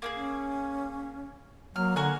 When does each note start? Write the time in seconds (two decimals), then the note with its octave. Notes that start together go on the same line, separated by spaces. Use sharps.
0.02 A#3 D#4 G#4
0.14 C#4
1.76 F#3 A#3 F6
1.96 D3 F#4 G#5 F#6